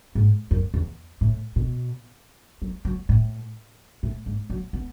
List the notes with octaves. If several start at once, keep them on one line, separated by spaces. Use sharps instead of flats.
G#2
F#2
E2
A2
B2
F#3
F#3
A2
A2
G#2
F#3
B3